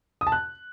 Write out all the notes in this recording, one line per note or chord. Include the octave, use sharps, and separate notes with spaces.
D#6
A5
F#6